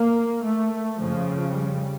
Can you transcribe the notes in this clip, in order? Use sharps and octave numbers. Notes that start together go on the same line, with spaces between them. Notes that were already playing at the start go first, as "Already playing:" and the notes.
Already playing: A#3
A3
F2 C#3 F3
G3